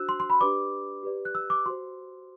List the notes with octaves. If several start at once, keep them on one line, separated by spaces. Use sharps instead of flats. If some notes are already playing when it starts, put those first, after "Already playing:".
Already playing: D4 F#4 C5 E6 F#6
C6
C6
B5
D4 G4 B4 D5 D6
G4 B4 D5
F#6
E6
D6
F#4 C5 C6